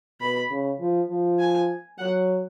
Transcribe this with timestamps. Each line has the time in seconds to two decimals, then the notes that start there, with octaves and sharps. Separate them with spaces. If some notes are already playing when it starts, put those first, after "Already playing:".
0.21 B2 B5
0.50 C#3
0.80 F3
1.09 F3
1.39 G#5
1.98 F#3 F#5